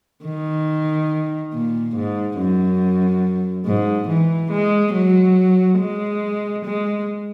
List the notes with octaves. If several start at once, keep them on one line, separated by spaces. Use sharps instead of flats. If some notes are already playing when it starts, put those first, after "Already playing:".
D#3
A#2
G#2
F#2
G#2
E3
G#3
F#3
G#3
G#3